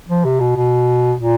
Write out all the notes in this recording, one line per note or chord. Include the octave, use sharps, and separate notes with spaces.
F3
C3
B2
B2
A#2